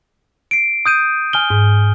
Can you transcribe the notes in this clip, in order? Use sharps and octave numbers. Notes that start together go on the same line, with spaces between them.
C7 D7
D#6 G6 D#7
G#5 F6 G7
G#2